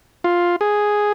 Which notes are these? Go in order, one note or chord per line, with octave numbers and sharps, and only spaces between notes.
F4
G#4